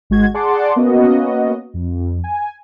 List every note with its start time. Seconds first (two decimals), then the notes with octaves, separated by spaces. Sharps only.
0.10 G#1 G#3 F#4 G#6
0.34 G#4 D5 F#5 A5 C6 D6
0.76 A#3 B3 C#4 F#4 D#5
1.74 F2
2.24 G#5